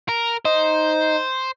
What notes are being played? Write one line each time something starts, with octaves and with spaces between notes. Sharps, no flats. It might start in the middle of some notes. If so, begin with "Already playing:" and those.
A#4
D#4 C5